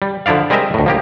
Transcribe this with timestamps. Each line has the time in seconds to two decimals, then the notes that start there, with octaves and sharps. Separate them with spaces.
0.02 G3
0.26 D3 F3 E4 D5 F5
0.50 G3 G#3 C4 A#4 D#5 E5
0.74 D2 A2
0.86 F3 A#3 G4